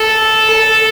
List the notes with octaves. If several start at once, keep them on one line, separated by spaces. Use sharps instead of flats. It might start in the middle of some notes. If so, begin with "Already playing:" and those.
Already playing: A4
A4